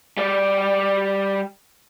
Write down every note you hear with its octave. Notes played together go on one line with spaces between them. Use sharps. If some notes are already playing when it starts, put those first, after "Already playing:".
G3 D5